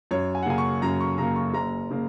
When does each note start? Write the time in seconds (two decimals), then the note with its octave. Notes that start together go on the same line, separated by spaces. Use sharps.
0.11 F#2 C#5
0.35 G#5
0.43 F#5
0.46 C#3 A#3 G#5
0.58 C#6
0.82 F#2 A#5
1.00 C#6
1.18 C#3 A#3 A#5
1.36 C#6
1.54 F#1 A#5
1.91 C#3 A#3